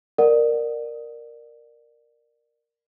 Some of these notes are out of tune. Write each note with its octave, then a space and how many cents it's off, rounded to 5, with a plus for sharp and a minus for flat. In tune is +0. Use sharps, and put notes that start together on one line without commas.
A#4 +0 D5 +25 F#5 +0